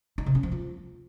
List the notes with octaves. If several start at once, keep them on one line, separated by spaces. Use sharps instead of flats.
D#4
C3
C#4
F3
F4